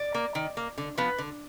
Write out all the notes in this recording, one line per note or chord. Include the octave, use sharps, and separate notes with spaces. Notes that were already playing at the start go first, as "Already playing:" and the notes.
Already playing: D5
A#3
D#3
A#3
D3
F3 B3 B4
D3